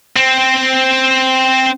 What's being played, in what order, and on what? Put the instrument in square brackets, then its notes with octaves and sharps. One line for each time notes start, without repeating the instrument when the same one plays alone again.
[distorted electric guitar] C4